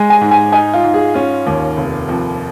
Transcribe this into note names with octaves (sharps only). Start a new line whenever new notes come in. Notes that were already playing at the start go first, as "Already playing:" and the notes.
Already playing: G#3 G#5
G#5
G#2
G#5
D#4 G#5
F4
G#2
G#4
C#4 F4
D#2
F1
F2